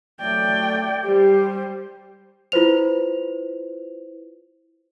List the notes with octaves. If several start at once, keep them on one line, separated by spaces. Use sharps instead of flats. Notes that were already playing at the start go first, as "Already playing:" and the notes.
F#3 A3 D5 G5
G3 G4 C5
E4 F4 B4 C5 F7